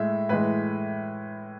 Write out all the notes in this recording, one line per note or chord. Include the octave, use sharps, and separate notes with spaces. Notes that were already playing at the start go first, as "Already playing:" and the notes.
Already playing: A2 G#3 E5
A2 E3 G#3 B4